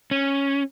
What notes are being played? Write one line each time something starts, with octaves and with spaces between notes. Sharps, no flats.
C#4